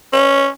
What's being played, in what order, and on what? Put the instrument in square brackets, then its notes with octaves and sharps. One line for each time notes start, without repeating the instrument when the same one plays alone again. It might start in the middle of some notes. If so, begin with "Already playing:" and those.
[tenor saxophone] C#4